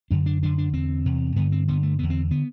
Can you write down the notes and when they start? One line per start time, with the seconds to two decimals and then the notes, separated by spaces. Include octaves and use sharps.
0.11 F#2 D3 D4
0.26 D4
0.42 F#2 D3 D4
0.58 D4
0.73 E2 D3 C4
1.05 E2 C3
1.36 G2 D3 B3
1.52 C4
1.68 G2 D3 B3
1.83 A3
1.99 E2 D3 B3
2.10 C4
2.31 D3 B3